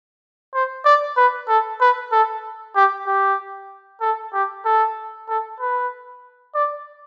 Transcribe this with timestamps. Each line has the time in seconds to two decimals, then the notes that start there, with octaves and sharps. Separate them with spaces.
0.54 C5
0.85 D5
1.17 B4
1.48 A4
1.81 B4
2.12 A4
2.75 G4
3.07 G4
4.01 A4
4.34 G4
4.65 A4
5.29 A4
5.60 B4
6.54 D5